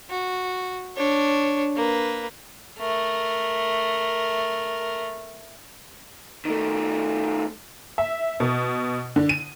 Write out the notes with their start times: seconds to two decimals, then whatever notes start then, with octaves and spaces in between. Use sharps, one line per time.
0.11 F#4
0.97 D4 C#5
1.76 A#3 B4
2.79 A3 A#4
6.45 D#3 A3
7.98 E5
8.40 B2
9.16 D3
9.29 D#7